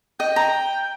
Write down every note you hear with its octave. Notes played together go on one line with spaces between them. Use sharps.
D#5 G5
A#5